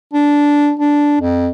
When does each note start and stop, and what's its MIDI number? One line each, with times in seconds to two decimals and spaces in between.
0.14 0.73 62
0.79 1.18 62
1.21 1.49 41